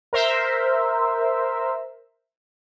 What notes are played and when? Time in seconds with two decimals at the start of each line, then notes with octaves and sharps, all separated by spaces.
0.13 A#4 C5 E5